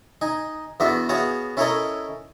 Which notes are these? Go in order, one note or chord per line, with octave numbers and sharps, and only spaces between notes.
D#4 G#5
E2 B3 D4 F#4 E5
B3 F#4 G#4 C#5 F5
C#4 E4 A4 A#4 C#5 D#5